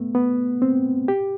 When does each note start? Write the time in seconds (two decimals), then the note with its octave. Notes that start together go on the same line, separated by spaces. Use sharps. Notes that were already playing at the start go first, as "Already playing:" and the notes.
Already playing: A3 B3
0.15 B3
0.62 C4
1.08 G4